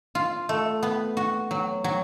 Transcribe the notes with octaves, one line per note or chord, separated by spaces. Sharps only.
F4
A3
B3
F#4
F#3
F#3